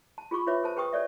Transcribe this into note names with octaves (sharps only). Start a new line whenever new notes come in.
A5
F4 G#4 B5 C#6 D6
F4 B4 C#5 E5 D6
A4 C5 A5
G#4 B4 G5 C#6 D#6
A4 C#5 D5 E5